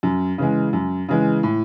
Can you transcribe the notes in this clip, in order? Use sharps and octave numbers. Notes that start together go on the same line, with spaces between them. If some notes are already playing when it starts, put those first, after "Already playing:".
F#2
C#3 E3 G#3
F#2
C#3 E3 G#3
A2